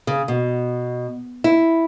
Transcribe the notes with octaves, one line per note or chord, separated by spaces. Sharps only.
C#3
B2
E4